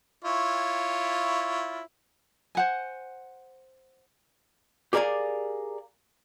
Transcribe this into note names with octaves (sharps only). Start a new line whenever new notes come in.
E4 F4 C#5
C5 F#5 G#5
G4 G#4 A#4 D5 F5 G#5